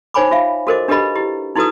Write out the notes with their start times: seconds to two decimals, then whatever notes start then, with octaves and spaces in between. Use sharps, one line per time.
0.14 D#4 C5 C#5 G#5 B5 D6
0.31 F4 E5 F5
0.67 F#4 A4 A#4 C5 D#5 D6
0.88 D4 G4 A4 B4 D#5 B5
1.16 E4 G4
1.56 D#4 E4 F#4 A4 B4 D#6